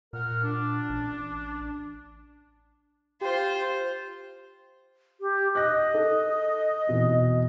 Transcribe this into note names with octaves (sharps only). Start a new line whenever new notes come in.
A#2 A#4 F#5 F6
D4
A1
F4 G4 C5
G4
D#5 F#6 A#6
A4
E2 B2 C4